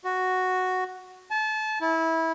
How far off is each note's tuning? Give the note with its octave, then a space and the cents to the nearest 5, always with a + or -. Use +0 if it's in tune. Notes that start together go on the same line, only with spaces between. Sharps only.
F#4 +0
A5 -30
E4 -20